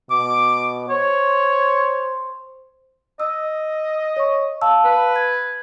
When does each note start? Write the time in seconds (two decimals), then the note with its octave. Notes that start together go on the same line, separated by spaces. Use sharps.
0.11 B2 D6
0.90 C5 C#5
3.20 D#5 E6
4.17 C#5 C#6
4.61 F5 A5 E6
4.85 B4
5.16 G#6